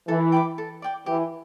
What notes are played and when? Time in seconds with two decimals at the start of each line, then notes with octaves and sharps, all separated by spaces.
0.08 E3 A4
0.32 G5 B5 D6
0.58 A4
0.82 D5 G5 D6
1.06 E3 G4